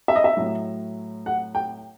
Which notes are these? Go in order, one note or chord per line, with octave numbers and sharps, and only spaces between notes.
E5
D#5
E5
A2 F#3
F#5
G5